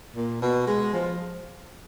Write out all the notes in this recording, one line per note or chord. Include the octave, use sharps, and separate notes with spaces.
A#2
B2
G#3
F3